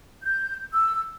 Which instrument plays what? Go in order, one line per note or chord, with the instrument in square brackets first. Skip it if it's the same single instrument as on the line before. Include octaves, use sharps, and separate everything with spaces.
[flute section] G6
E6